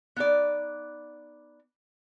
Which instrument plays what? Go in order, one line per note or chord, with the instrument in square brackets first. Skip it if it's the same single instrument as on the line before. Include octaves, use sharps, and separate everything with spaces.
[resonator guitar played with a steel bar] B3 D#4 D5